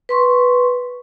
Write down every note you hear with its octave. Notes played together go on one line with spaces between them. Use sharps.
B4 C6 C#6